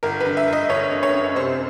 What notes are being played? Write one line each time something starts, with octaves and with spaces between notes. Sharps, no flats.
G1 A#4
B4
D3
E5
G1 D#5
G1 C#5
D3
C#5
F#2
C3 C5